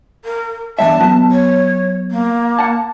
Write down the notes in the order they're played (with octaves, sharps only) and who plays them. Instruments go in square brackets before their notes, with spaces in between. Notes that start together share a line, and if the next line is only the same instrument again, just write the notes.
[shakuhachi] A#4
[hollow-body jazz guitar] E2 G2 E5 [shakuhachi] A5
[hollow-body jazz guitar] F#3 B3
[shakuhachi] C#5
A#3
[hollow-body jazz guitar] F#5 A5